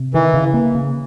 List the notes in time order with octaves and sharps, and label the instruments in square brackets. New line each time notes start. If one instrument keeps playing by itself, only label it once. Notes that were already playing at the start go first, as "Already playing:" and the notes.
Already playing: [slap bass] C3
[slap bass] D#3 [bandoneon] E3
[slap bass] C#3
A#3
C#3